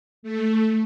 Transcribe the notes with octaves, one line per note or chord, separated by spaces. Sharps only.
A3